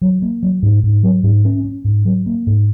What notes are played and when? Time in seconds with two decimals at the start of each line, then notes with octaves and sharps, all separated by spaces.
0.02 F#3
0.22 A#3
0.43 F#3
0.63 G#2
0.83 G#2
1.03 F#3
1.23 G#2
1.45 C#4
1.64 C#4
1.84 G#2
2.05 F#3
2.26 A#3
2.47 G#2